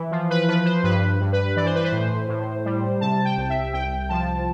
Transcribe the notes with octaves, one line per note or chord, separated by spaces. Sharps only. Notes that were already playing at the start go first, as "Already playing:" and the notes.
Already playing: E3
F3
B4
F3 B4
C5
G2 B4
G2
B4
E3 D5
C5
B4
C5
A2
A2
G3
C3 A5
G5
C2
E5
C2 G5
F3 A5